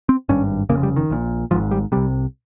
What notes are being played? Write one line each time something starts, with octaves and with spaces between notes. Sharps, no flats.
C4
G#1 G2 C#4
F1 D#2 C#3 A#3
G3
D#3
A#1 A#2
G#1 G#2 F3
G3
C2 C3 G3